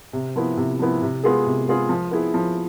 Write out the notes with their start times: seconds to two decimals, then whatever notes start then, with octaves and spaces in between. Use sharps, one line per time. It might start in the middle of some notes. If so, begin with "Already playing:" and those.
0.13 C3
0.36 F3 B3 E4
0.57 C3
0.79 F3 B3 E4
1.02 C3
1.24 G#3 B3 F4 G#4
1.46 C3
1.68 G#3 B3 F4 G#4
1.89 F3
2.11 B3 E4 G#4
2.34 F3